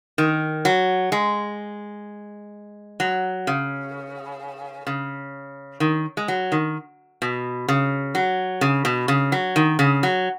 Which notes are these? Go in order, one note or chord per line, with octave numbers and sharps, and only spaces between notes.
D#3
F#3
G#3
F#3
C#3
C#3
D#3
G#3
F#3
D#3
B2
C#3
F#3
C#3
B2
C#3
F#3
D#3
C#3
F#3